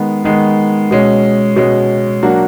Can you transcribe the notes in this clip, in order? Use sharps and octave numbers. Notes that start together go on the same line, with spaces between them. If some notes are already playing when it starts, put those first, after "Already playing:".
Already playing: D#3 G#3 B3
D#3 G#3 B3
B2 G#3 C#4
B2 G#3 C#4
F#3 A#3 D4 F#4